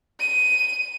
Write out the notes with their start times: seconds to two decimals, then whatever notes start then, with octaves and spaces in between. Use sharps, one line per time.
0.20 D#7